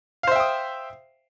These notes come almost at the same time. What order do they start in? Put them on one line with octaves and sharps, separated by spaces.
F5 C5 E5 G5 D#6